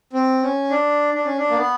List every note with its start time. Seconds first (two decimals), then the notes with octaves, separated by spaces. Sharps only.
0.13 C4
0.42 C#4
0.70 D4
1.14 D4
1.26 C#4
1.38 D4
1.50 A#3
1.56 B3